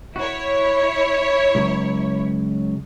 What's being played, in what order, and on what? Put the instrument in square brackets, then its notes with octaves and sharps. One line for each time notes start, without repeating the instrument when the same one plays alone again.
[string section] E4 C#5 [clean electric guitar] F#4
[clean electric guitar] C#2 F#3